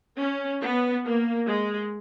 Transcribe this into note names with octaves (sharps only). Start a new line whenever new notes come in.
C#4
B3
A#3
G#3